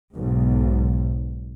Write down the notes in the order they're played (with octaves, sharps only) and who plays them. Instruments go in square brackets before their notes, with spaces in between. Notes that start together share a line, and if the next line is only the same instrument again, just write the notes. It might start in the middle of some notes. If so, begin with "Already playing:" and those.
[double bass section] B1 G#2